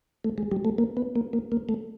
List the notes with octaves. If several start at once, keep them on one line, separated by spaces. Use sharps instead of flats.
A3
G#3
G3
A3
A#3
B3
A#3
A#3
A#3
A3